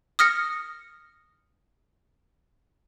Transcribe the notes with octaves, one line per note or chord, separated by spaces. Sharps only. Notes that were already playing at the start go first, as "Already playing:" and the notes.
D#6 F6 A#6 C#7